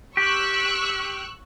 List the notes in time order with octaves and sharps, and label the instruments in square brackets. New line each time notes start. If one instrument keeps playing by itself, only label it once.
[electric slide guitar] G4 [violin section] C#6 E6 F#6